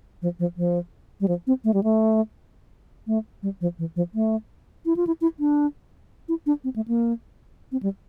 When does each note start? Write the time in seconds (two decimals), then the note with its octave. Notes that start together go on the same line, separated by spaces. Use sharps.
0.22 F3
0.39 F3
0.57 F3
1.21 G3
1.28 F3
1.47 C4
1.64 A3
1.74 G3
1.84 A3
3.07 A3
3.43 G3
3.61 F3
3.79 E3
3.96 F3
4.14 A3
4.86 E4
4.96 F4
5.07 E4
5.21 E4
5.40 D4
6.29 E4
6.46 D4
6.64 C4
6.76 A3
6.88 A#3
7.72 C4
7.83 G3